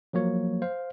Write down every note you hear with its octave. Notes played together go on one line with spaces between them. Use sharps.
F3 F#3 A#3 C#5
C5 F5